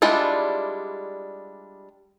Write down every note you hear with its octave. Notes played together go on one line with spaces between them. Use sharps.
G3 G#3 D4 E4 F4